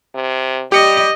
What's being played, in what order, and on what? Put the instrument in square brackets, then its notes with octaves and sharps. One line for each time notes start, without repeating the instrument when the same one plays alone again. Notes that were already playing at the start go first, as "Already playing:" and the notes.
[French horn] C3
[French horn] G3 [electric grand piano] G4 C#7 [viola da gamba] D#5